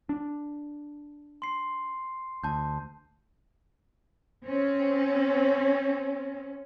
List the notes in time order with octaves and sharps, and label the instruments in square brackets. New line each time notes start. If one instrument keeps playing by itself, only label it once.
[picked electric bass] D4
[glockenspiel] C6 C7
[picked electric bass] D2 [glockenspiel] A5 G6
[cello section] C4 C#4